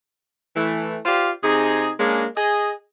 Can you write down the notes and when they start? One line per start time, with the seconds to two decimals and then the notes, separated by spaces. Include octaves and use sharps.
0.56 E3 A3
1.05 F4 G4 C5 D5 F5
1.44 C3 D#4 G#4
2.00 G#3 A#3 C#4 D4
2.37 G#4 D#5